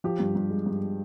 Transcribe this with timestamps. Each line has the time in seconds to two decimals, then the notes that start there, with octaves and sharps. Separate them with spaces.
0.04 F3 G4
0.19 G2
0.35 G2
0.51 G#3
0.66 G2